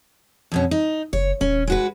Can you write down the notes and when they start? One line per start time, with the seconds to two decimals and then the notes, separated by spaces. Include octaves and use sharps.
0.52 F2 B2 C#4
0.71 D#4
1.13 F#1 C#5
1.41 D#1 C#4
1.67 G#3 F#4 B4